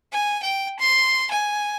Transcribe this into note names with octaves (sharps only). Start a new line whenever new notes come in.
G#5
G5
C6
G#5